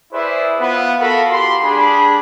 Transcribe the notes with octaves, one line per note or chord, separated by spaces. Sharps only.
E4 G#4 B4 C5 D5 E5
B3 F4 B4
F#4 A4 A#4 F5 B5
F4 G4 B5 C6
G3 D4 G#4 B5